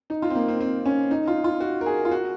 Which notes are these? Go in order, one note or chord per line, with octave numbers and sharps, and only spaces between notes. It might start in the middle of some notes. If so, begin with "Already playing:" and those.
D#4
F4
C4
A#3
C4
C4
C#4
D#4
F4
F4
F#4
A#4
G#4
F4
F#4